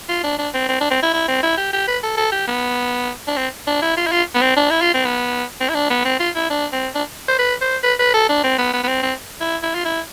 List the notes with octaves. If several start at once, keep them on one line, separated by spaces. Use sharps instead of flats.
F4
D4
D4
C4
C4
D4
C4
E4
E4
C4
E4
G4
G4
B4
A4
A4
G4
B3
D4
C4
D4
E4
F4
E4
F4
B3
C4
D4
E4
F4
C4
B3
C4
E4
D4
B3
C4
F4
E4
D4
C4
D4
C5
B4
C5
B4
B4
A4
D4
C4
B3
B3
B3
C4
C4
E4
E4
F4
E4